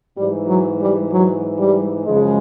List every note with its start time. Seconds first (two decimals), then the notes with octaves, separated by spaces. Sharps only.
0.17 G#2 E3 G3
0.48 F#3
0.80 G3
1.11 F#3
1.58 G3
2.05 F#2 C#3 F3 G#3